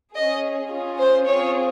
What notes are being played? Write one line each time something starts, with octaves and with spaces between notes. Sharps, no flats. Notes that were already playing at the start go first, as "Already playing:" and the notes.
C#4 G#4 D#5
C#4 F4 G#4
C5
C4 F4 G#4 C#5